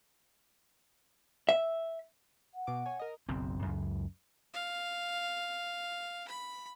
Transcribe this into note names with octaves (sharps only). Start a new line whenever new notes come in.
E5
F#5
B2 D6
C#5 G#5
A#4 D#5
F#1 B1 F#2 C4
C#2 F#2
F5
B5